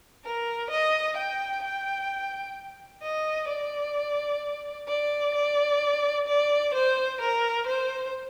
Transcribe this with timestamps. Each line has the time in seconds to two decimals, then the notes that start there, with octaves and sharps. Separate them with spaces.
0.25 A#4
0.70 D#5
1.17 G5
1.63 G5
3.03 D#5
3.49 D5
4.88 D5
5.34 D5
6.28 D5
6.74 C5
7.21 A#4
7.67 C5